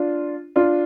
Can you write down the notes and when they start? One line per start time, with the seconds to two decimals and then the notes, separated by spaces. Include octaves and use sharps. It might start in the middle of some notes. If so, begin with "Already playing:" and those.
Already playing: D4 F4
0.56 D4 F4